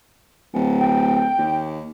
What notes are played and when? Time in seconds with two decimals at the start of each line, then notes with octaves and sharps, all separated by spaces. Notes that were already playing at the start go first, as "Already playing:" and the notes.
0.54 D1
0.80 G5
1.39 D#2